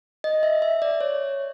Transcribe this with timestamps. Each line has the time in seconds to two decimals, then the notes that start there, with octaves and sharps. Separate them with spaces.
0.24 D#5
0.43 E5
0.62 E5
0.82 D5
1.01 C#5